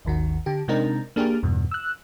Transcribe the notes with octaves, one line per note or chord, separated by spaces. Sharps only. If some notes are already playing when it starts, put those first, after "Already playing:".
G#1 D#2 D#3 F#4
D3 G4
C3 G#3 C4 D4 D#4 A#4
A#3 D4 G4 G#4 A#4
E2 G2 B2
E6 F#6